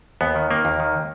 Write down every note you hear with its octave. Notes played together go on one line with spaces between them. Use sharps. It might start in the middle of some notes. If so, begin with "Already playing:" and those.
D#2 B3
D#3
D#3 A#3
D#2
D#3